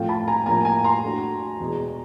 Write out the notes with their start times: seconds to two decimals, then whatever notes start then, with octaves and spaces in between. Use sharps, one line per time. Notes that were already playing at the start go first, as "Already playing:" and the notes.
Already playing: A2 F3 A3 C4 F4 F5 G5
0.09 A5 B5
0.28 G#5 A#5
0.46 A2 F3 A#3 G#5 A#5
0.65 G#5 A#5
0.84 A#5 C6
1.03 A3 D4 F#4
1.60 E2 B2 G#3